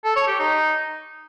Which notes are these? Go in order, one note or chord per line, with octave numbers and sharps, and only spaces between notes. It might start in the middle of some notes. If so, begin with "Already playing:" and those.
A4
C#5
G4
D#4